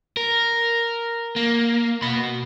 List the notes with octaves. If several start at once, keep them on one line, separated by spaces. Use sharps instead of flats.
A#4
A#3
B2 B5